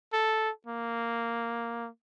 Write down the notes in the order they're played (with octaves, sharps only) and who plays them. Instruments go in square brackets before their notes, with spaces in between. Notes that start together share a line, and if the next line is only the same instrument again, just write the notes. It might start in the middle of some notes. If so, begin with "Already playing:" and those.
[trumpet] A4
A#3